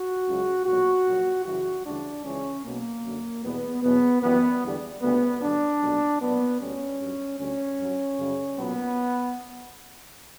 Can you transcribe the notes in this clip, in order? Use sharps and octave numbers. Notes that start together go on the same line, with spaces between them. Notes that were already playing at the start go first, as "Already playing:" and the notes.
Already playing: F#4
C#2 C#3 F#3
B1 A#2 F#3 F#4
A#1 A#2 F#3
F#2 C#3 E3 G3 F#4
D2 C#3 E3 G3 D4
C#2 C#3 E3 C#4
B1 B2 F#3 A#3
F#2 D3 F#3
E2 B2 G3 B3
E2 B2 F#3 B3
F#2 E3 G3 B3
E2 D3 G3
D2 C#3 G3 B3
G2 D3 F#3 D4
B1 A#2 G3
B1 A#2 F#3 B3
D2 D3 G3 C#4
G2 F#3
D2 D3 G3 C#4
G2 F#3
F#2 C#3 G3
B1 A#2 F#3 B3